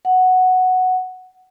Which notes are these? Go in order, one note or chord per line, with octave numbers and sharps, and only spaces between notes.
F#5